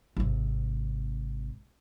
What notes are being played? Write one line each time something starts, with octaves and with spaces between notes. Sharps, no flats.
G#1 C3